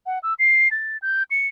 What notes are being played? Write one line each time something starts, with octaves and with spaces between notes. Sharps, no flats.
F#5
E6
C7
A6
G6
C#7